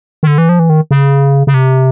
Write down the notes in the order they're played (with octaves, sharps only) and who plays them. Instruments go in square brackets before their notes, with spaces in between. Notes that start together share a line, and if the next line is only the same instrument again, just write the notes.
[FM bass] D#3
D3
E3
F3
E3
D#3
C#3
C#3
C3